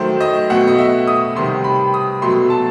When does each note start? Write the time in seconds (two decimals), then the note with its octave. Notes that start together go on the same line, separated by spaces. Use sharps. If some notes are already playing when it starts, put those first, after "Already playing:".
Already playing: D#3 F#3 A3 C5
0.21 D#5
0.50 B2 A3 F#5
0.67 D#5
0.78 E5
1.08 D#6
1.35 C3 D#3 G3 C6
1.64 B5
1.94 D#6
2.22 B2 F#3 A3 C6
2.50 A5